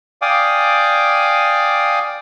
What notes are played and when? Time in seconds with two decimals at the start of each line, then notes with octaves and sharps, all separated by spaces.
0.22 D5 F5 G5 G#5 D6 D#6